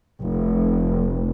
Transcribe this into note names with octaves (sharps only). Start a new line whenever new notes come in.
F1